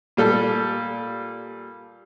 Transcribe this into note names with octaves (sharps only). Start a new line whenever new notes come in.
A#2 G3 A4